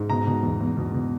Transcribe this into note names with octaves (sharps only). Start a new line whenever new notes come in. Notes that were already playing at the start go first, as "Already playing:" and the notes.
Already playing: G#2
B2 A#5
B2
E2
E2
B2
B2